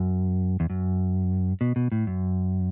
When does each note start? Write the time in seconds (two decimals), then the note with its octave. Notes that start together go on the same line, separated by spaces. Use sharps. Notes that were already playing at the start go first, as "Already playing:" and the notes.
Already playing: F#2
0.60 E2
0.70 F#2
1.61 B2
1.76 B2
1.92 A2
2.07 F#2